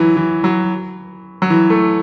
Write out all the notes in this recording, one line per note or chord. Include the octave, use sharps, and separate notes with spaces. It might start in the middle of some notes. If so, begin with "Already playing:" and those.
Already playing: E3 F#3
E3
F#3
F#3
E3
A3